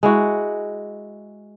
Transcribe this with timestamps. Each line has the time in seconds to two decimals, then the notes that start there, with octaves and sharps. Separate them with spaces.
0.03 G#3 E4 F#4